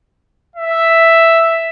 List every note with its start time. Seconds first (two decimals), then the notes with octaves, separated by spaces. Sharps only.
0.56 E5